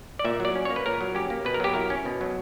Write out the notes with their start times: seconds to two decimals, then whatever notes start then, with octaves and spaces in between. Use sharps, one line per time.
0.19 D5
0.25 A#2 E5
0.40 F#3 D5
0.55 C#4
0.65 A#3 C#5
0.76 B4
0.86 A#2 A#4
1.01 F#3
1.15 C#4 G4
1.30 A#3
1.45 B2 B4
1.54 A#4
1.60 F#3 G4
1.74 E4 A#4
1.90 C#4
2.05 B2
2.21 F#3